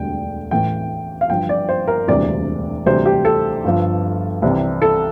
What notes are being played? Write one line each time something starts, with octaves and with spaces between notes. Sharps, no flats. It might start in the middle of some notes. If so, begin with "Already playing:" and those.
Already playing: E1 D2 D3 G3 G5
A1 A2 E3 G5
F5
G1 G2 F3 G5
D5
C5
A#4
E1 D2 C3 E3 G3 D5
D2 C3 E3 G3 C5
G4
A4
G1 G2 F3
C2 C3 E3 G3
A4